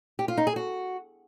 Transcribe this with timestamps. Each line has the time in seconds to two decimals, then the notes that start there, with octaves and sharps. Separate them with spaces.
0.19 G4
0.28 F4
0.37 D#4
0.47 G#4
0.56 F#4